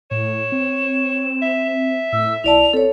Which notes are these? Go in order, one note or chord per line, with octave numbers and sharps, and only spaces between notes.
A2 C#5 E7
C4
E5
A2 E6
B1 E4 D5 A5 F7
C4 A4 C#5